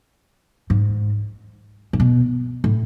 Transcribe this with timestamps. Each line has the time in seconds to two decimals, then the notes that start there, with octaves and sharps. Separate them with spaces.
0.70 G#2
1.93 A2
2.00 B2
2.64 A2